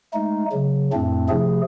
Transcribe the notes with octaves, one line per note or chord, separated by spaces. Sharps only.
G#3 A3 D#4
C#3 F#3
F2 A2 A3 C4 D4
C3 F3 A3 G#4